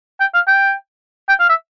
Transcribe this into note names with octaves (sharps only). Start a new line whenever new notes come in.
G5
F5
G5
G5
F5
E5